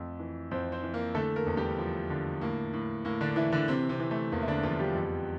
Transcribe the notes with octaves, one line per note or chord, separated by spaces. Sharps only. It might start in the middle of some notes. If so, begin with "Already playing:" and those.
Already playing: F2 A3
E3
F2 C4 C5
C4 C5
E3
A#3 A#4
D3 A3 A4
A#3 A#4
E2
G3 G4
F3
D3
A2 A#3
A2
A2 A#3
D3 D4
E3 E4
D3 D4
C3 E3 C4
C3 C4
E3
A3
E2 A#3
E4
D3 D4
E2 F3 F4
G3 G4
F2